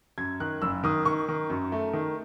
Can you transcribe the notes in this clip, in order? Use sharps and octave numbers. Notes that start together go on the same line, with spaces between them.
F#2 G#6
D#3 F#6
F#1 E6
D#3 D#6
D#3 C#6
D#3
F#2
A3
D#3